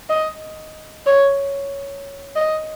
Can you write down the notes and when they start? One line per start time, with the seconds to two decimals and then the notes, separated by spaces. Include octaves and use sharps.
0.10 D#5
1.06 C#5
2.36 D#5